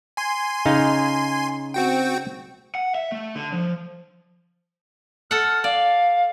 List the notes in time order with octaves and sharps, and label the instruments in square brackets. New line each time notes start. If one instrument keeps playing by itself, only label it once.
[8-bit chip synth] G#5 C6
[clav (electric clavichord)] C#3 D#4 F5
[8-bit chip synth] C4 F#4 G5
[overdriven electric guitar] F#5
E5
A3
D3
F3
[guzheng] A4 F#5 [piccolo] F6
[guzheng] D5 [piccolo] F5